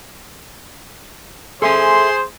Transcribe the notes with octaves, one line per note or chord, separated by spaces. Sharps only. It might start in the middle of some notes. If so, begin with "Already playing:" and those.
G#4 A4 C5 E5 G#5 C6